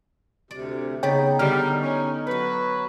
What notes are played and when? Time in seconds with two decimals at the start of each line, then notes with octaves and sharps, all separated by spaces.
0.51 D2 C3 D5
1.03 C#3 B3 D#4 C#5 D5 G5
1.39 D3 G3 B3 F6
1.82 C#4
2.27 F#3 F#4 B4 C#5 F#5